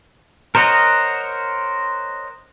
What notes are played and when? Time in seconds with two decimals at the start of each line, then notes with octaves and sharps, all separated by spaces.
0.55 A#4 C5 C#5 D#5 F#5